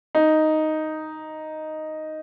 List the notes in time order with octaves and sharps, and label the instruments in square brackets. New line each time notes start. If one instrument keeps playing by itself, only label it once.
[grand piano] D#4